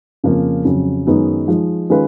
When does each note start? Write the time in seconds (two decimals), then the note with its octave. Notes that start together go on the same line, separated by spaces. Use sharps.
0.24 F2 C#3 F3 A#3
0.65 F2 C#3 F#3
1.07 F#2 D#3 G#3 B3 D#4
1.48 F3 G#3 D#4
1.90 D#3 G#3 C#4 F4 B4